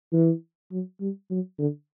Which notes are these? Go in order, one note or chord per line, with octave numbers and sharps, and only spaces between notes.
E3
F#3
G3
F#3
D3